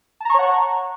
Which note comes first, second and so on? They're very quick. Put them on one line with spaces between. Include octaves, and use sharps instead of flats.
A5 A#5 C#6 C#5 F#5